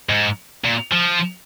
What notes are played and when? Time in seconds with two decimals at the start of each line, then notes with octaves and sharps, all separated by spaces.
0.09 G#2
0.65 A#2
0.92 F3